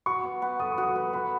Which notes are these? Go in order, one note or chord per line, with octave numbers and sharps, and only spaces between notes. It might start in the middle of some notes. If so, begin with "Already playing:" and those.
F#4 C#6
B3
B3
A4 D#6
C#6
F#4 D#6
B3
B3 B5